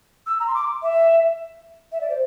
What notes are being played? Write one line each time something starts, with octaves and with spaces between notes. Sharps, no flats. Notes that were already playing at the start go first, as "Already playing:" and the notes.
E6
A#5
C6
D6
E5
E5
D5
C5